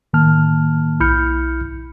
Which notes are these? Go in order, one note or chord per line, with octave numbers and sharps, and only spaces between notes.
A2 D#3 A#3 A5 F6
B1 E4 B5 F6 G6 C#7